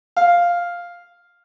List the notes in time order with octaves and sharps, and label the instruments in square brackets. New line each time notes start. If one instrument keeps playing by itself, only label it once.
[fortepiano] F5